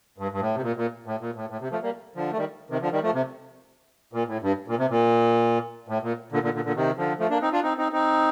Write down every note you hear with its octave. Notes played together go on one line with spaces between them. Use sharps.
G2
G2
A2
C3
A#2
A#2
A2
A#2
A2
A2
C3
F3 A3
G3 A#3
D3 F3
A3
D#3 G3
C3 D#3
D3 F3
D#3 G3
F3 A3
C3
A#2
A2
G2
A#2
C3
A#2
A2
A#2
A#2 D3
A#2 D3
A#2 D3
A#2 D3
C3 D#3
D3 F3
F3 A3
A#3 D4
C4 D#4
D4 F4
C4 D#4
C4 D#4
C4 D#4